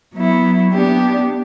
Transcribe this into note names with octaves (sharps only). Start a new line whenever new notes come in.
F#3 B3 E4
B3 D4 G4